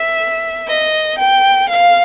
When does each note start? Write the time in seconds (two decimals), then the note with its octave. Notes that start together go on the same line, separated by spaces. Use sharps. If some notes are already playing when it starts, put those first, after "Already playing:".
Already playing: E5
0.68 D#5
1.18 G5
1.69 F5